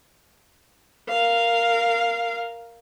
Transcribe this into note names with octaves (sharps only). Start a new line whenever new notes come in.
A#4 F5